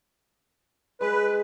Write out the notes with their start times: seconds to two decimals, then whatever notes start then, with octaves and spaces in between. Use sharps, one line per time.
1.01 G#3 B4